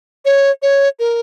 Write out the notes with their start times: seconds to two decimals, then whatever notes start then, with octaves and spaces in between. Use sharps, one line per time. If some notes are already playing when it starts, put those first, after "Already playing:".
0.25 C#5
0.62 C#5
0.99 A#4